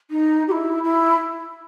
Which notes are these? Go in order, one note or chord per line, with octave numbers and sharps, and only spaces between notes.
D#4
G4
E4
E4